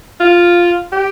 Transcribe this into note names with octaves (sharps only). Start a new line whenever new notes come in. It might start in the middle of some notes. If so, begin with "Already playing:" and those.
F4
G4